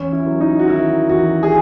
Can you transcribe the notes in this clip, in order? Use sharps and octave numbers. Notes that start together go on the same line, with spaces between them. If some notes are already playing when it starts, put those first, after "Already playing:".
Already playing: E2 C#4
E4
F#3
D#4
F#4
D#3 E4
E2 F#4
G#4